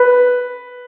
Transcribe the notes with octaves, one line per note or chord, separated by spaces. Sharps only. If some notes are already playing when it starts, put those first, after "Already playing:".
Already playing: B4